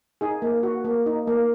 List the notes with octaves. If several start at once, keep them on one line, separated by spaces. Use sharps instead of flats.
D#4 G#4
A#3
F#4
A#3
D#4
A#3